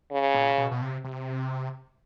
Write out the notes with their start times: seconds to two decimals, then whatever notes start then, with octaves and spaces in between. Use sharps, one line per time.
0.12 C#3
0.35 A#2
0.58 B2
0.71 B2
0.82 C3
1.04 C3